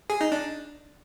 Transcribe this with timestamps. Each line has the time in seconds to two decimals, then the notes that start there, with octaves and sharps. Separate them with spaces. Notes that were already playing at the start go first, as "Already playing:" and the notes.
0.10 G#4
0.21 D#4
0.32 D4